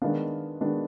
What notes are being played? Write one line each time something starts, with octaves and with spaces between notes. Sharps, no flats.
D#3 G#3 B3 D4 F5
D#3 G#3 B3 D4